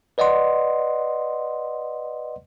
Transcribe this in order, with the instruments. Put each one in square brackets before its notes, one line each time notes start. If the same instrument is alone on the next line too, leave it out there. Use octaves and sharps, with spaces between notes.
[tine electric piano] B4 D5 D#5 F#5 C6